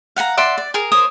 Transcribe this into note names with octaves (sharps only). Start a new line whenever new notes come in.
F5 F#5 G#5 A#5
D5 E5 F#5 C6
D5
G#4 A#4
A#4 C5 C#5 D#6